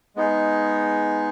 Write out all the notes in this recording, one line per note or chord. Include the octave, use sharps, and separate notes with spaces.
G#3 B3 D#4 G#4